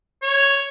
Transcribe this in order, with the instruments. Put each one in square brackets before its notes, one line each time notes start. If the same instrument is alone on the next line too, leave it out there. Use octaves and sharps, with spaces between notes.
[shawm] C#5